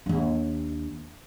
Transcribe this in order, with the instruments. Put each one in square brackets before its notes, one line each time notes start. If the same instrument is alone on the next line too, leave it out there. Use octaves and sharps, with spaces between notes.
[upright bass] D#2 D4